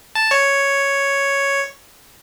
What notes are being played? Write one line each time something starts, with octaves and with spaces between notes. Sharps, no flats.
A5
C#5